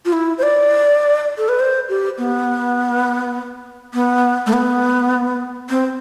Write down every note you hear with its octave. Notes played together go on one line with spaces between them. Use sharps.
F4
E4
C5
D5
A4
B4
C5
G4
B3
B3
A3
B3
C4